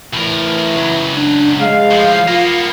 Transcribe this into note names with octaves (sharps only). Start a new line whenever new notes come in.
A2 E3 A#4
C#2 F#3
D4
G#3 F5
A2 F3
A#3 B3 F4